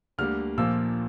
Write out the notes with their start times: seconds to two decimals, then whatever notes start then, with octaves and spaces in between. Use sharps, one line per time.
0.18 D2 D3 G3 A#3 F6
0.57 A#1 A#2 F3 A#3 E6